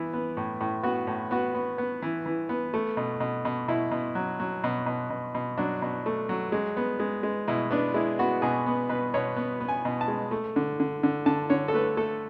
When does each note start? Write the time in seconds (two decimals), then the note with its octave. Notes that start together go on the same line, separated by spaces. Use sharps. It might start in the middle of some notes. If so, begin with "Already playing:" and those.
Already playing: E3 B3
0.14 B3
0.37 A2
0.61 A2
0.83 B3 F#4
1.07 A2
1.31 B3 F#4
1.54 B3
1.78 B3
2.02 E3
2.26 E3
2.49 B3
2.74 A3
2.97 B2
3.20 B2
3.45 B2
3.68 B2 E4
3.91 B2
4.15 F#3
4.40 F#3
4.64 B2
4.86 B2
5.10 B2
5.35 B2
5.58 F#3 D4
5.82 B2
6.06 A3
6.29 F#3
6.52 G#3
6.77 B3
7.00 G#3
7.23 G#3
7.48 B2 E4
7.71 B3 D4
7.94 G#3 E4
8.19 B3 F#4
8.42 B2 G#4
8.67 B3
8.89 B2 B4
9.14 B2 C#5
9.36 B3
9.60 B3
9.68 G#5
9.85 B2
10.01 A5
10.08 G#3
10.31 A3
10.56 D3
10.80 D3
11.03 D3
11.26 D3 A5
11.50 D3 C#5
11.68 A4
11.74 A3 B4
11.97 A3 A4